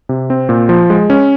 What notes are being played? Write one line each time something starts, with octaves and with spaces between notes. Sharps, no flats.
C3
C4
A#2
F3
G#3
C#4